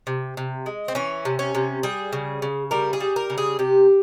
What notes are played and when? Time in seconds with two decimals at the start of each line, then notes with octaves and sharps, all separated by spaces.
0.07 C3
0.37 C3
0.66 G#3
0.88 C4
0.95 E3 C#4
1.25 C3
1.39 C#4
1.55 C3
1.83 G3 G#4
2.13 C#3
2.42 C#3
2.71 G3 A#4
2.93 G#4
3.00 G3
3.16 A#4
3.30 C#3
3.38 G#4
3.59 C3 G4